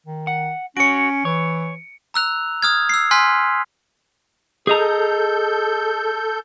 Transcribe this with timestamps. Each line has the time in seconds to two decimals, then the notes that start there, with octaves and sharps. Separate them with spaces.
0.07 D#3
0.27 F#5
0.77 C#4 F#4 C#5 C#7 D7
1.25 E3 C#5
2.14 A#5 E6 F#6 F7
2.62 D#6 F6 G#6
2.89 E6 C7
3.11 G#5 C6 F6 F#6 B6
4.67 G#4 A4 D#5 A#5 G6